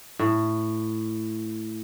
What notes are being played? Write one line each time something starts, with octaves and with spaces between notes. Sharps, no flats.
A2